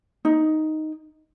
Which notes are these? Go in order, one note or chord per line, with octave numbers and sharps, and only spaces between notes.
D#4